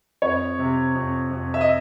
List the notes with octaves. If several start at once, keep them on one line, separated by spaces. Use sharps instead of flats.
F2 C#5
C3
F2
F2
E5
D#5